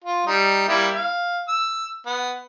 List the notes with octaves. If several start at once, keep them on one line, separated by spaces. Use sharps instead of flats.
F4
G3 D#4
G3 A#3 E4
F5
E6
B3